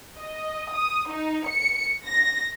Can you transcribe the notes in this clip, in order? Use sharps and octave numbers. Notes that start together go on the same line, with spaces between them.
D#5
D#6
D#4
C#7
A#6